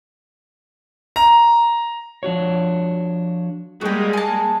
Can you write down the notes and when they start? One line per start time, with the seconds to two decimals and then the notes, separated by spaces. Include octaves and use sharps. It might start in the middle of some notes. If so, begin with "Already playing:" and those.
1.16 A#5
2.23 F3 D4 F#4 C#5
3.81 G3 G#3 A#3 F#4 G4
4.13 G#5 A5